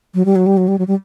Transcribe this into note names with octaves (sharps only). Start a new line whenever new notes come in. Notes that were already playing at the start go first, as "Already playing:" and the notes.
F#3
G3
F#3
G3
F#3
G3
F#3
G3